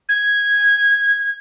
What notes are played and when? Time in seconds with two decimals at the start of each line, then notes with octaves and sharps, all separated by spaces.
0.09 G#6